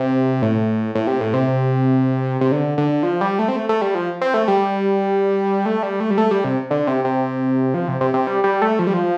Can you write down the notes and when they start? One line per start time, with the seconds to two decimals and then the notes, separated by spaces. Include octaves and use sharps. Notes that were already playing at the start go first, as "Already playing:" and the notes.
Already playing: C3
0.42 A2
0.95 A2
1.07 C3
1.21 A2
1.34 C3
2.41 C3
2.52 D3
2.78 D3
3.03 F3
3.21 G3
3.39 A3
3.48 C4
3.56 A3
3.69 A3
3.82 G3
3.95 F3
4.21 C4
4.34 A3
4.48 G3
5.66 A3
5.83 G3
6.00 A3
6.10 G3
6.18 A3
6.31 G3
6.44 C3
6.70 D3
6.87 C3
7.04 C3
7.74 F3
7.88 C3
8.01 C3
8.14 C3
8.27 G3
8.44 G3
8.62 A3
8.79 F3
8.87 G3
8.94 F3